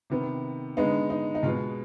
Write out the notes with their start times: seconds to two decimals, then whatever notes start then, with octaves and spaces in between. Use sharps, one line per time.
0.10 C3 D#3 B3
0.77 D3 G#3 B3 D#4
1.10 D#4
1.35 D#4
1.43 B2 G#3 B3 F4